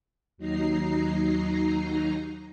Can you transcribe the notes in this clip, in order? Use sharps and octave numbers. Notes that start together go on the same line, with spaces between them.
D#2 F#3 D#4 A#5 C7